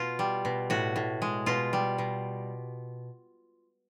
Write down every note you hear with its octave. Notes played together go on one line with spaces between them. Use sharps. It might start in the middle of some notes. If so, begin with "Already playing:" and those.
Already playing: B2 F4
G3
B2
A2 F#4
A2
G#3
B2 F4
G3
B2